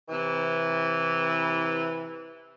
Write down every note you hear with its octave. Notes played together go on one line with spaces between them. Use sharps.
C3 E3